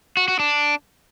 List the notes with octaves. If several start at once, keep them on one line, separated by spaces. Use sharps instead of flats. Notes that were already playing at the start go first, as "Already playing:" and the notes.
F#4
F#4
D4